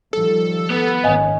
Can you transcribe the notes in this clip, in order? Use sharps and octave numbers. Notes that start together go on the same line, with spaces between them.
D#3 F3 G3 A4
B3
G#1 D#3 C#4 D#5 F5 G#5